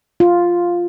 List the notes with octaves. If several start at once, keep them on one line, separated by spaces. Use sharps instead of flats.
F4